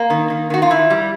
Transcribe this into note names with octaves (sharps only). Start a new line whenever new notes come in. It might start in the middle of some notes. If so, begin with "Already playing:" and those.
Already playing: A#3
D#3
D#3
D#3 F#4
F4
E3 E4
G3